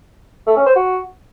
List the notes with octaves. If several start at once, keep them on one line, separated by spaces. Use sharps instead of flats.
A3
C#4
C5
F#4